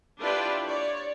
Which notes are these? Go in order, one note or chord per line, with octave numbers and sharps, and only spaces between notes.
D4 E4 F4 G4 B4 D5
C#5 D5